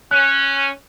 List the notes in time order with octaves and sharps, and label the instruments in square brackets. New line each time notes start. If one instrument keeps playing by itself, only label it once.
[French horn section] C#4 [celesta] F#6